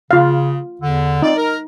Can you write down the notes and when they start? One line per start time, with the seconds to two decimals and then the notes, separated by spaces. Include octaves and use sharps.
0.11 C#3 F4 F5
0.81 E2 D3
1.22 C4 D#4 F4 D5
1.36 A#4